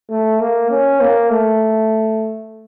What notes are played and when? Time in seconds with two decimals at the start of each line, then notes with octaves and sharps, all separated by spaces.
0.10 A3
0.40 A#3
0.71 C#4
1.01 A#3
1.30 A3